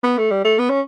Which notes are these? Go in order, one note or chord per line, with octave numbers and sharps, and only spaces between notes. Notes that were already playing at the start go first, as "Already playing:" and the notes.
B3
A3
G3
A3
B3
C#4